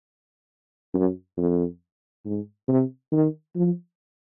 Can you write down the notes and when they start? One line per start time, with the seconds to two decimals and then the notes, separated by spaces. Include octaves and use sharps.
0.94 F#2
1.37 F2
2.25 G#2
2.68 C3
3.12 D#3
3.56 F3